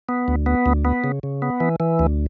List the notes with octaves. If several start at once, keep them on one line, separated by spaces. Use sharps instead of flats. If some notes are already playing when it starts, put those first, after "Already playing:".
B3
D2
B3
D2
B3
C#3
C#3
B3
E3
E3
D2